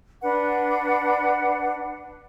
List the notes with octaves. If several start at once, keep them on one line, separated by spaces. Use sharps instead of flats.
D4 B4 F#5